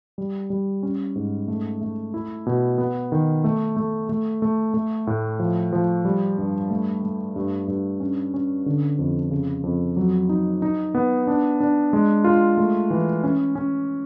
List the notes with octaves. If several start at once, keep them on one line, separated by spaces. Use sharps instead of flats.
G3
G3
C#4
G#2
A3
A3
E4
B2
B3
D#3
A3
A3
A3
A3
A3
A2
F3
F3
G3
G2
A3
A3
G2
G2
C#4
C#4
D3
F2
C#3
F2
F#3
D#4
D#4
B3
D4
D4
G#3
F4
A3
E3
C#4
C#4